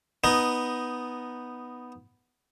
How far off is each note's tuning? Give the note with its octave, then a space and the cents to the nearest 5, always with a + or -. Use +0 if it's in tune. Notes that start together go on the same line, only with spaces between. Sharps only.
B3 +0 D#4 +0